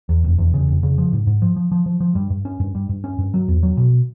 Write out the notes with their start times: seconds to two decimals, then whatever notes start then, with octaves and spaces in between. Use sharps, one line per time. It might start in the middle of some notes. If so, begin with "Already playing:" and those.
0.09 E2
0.24 F1
0.38 E2
0.54 C#3
0.68 F1
0.83 C#3
0.98 F3
1.13 G#2
1.27 G#2
1.42 F3
1.56 F3
1.72 F3
1.86 F3
2.00 F3
2.15 G2
2.30 G2
2.45 C#4
2.60 G2
2.75 G2
2.89 G2
3.04 C#4
3.18 G2
3.34 F#3
3.48 E2
3.63 F#3
3.77 B2